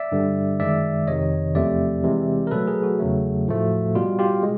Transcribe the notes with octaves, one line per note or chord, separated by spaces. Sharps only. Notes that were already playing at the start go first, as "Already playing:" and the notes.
Already playing: D5 E5
G2 D3 G3
F#2 D#3 G#3 D5 E5
F2 C3 D#3 C#5 D#5
E2 C3 F3 A3 D5 E5
C3 E3 G#3
A#4
B2 F#3 A3 A4 B4
G#4 A#4
F#4
E2 C#3 F#3 A3
A2 F3 A3
B2 G3 F4
F4 G4
G#3